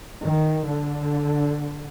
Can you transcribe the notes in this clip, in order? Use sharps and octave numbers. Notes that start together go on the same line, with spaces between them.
D#3
D3